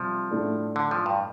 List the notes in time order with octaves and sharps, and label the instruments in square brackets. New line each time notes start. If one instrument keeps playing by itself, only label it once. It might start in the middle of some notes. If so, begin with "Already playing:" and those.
Already playing: [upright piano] C3 G3 [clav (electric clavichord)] F3
[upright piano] A2 A3 D4 A4
[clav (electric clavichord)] D3
F3
G2